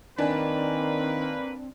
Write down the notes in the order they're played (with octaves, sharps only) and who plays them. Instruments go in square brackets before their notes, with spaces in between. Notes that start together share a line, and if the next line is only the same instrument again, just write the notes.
[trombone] D#3 [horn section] A#3 B4 [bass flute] C4 [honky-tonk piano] D4 G#5